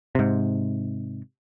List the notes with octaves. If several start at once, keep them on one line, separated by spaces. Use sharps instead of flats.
G#2 C3